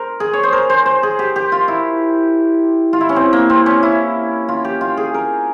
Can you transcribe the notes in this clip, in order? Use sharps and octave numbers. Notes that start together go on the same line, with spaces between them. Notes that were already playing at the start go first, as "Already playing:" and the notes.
Already playing: A#4 C5
G#4
C#5
C5
A#4
C5
C5
G#4
G4
G4
F4
E4
F4
E4
C#4
C4
A#3
C4
C#4
E4
F4
G4
F4
G#4
A#4